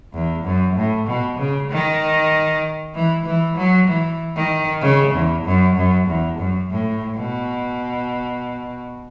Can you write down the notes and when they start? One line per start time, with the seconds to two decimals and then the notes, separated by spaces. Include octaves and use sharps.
0.14 E2
0.44 F#2
0.76 A2
1.07 B2
1.38 C#3
1.70 D#3
2.95 E3
3.26 E3
3.57 F#3
3.88 E3
4.36 D#3
4.82 C#3
5.14 E2
5.45 F#2
5.76 F#2
6.07 E2
6.39 F#2
6.70 A2
7.17 B2